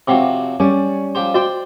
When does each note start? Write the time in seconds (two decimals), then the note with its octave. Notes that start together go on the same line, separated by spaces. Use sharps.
0.07 C3 F3 F#3 F#5 G5 D6
0.60 G3 C#4 D5
1.15 F3 G4 C5
1.34 F#4 C5 D5 D#5 G5